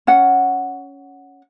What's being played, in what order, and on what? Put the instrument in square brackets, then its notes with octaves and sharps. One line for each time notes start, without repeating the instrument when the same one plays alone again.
[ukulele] C#4 F#5